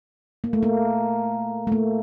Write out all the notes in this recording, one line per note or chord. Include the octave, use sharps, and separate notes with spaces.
A#3
A3
A#3
A3
A#3